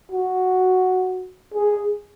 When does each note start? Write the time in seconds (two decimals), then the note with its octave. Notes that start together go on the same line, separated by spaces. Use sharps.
0.12 F#4
1.54 G#4